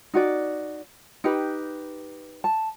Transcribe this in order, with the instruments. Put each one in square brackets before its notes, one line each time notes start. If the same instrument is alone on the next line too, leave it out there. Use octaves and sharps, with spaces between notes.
[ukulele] D#4 F#4 D5
D#4 G4 B4
A5